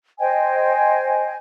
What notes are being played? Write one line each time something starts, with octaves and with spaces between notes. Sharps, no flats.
C5 D#5 G5 G#5